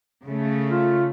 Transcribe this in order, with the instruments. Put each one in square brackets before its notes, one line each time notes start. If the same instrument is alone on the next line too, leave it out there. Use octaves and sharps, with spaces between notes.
[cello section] C#3 A3
[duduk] F4